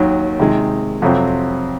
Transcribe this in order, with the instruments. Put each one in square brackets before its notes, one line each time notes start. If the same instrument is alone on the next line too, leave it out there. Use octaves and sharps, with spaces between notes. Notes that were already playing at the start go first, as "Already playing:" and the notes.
Already playing: [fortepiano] D#2 D#3 F#3
C3 D#3 G#3
F2 C3 F#3 C4